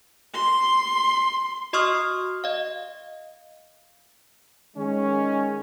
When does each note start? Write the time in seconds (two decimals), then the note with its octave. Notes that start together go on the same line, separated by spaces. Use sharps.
0.34 C6
1.73 F#4 D#5 C6 C#6 D#6 F6
2.44 D#5 F5
4.76 D#3 G#3 C#4